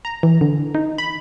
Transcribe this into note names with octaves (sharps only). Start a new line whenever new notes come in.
A#5
E3
D3
D#4
B5